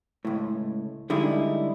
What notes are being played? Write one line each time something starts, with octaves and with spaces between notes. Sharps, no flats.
C#2 A2
D3 G3 G#3 D#4 E4